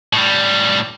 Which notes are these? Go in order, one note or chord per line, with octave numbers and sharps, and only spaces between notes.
A2 G3